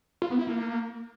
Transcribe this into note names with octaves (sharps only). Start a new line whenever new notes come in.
F4
B3
E4
A#3